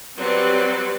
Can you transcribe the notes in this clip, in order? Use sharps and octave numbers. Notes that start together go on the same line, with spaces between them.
F#3 G3 C4 B4 D5